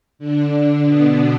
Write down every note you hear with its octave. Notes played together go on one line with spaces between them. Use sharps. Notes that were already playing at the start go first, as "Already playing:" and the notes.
D3 D4
B2 B3